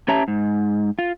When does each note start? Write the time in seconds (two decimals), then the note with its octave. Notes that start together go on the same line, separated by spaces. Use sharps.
0.08 C#4 G4 C#5 E5 A5 A#5
0.28 G#2
0.99 F4